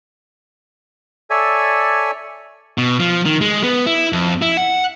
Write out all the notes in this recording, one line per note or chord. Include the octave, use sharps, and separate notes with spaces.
A4 C#5 D5 E5 G#5
B2
F3
D#3
G#3
B3
E4
F2
E4
F#5